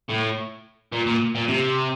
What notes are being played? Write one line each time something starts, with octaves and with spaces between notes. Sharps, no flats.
A2
A#2
A#2
A#2
C3